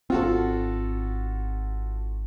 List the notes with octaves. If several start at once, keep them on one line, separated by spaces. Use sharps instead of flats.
G#1 C4 F4 F#4 A4